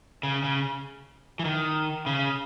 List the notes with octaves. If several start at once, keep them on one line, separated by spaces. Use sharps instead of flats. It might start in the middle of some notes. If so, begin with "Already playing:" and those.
C#3
C#3
E3
D#3
C#3